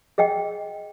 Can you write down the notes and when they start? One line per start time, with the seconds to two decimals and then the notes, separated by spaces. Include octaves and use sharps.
0.18 G#4 D#5 F#5 G5